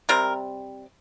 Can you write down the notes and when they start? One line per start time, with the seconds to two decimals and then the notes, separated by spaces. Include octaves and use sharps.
0.09 C3 G3 C4 A#4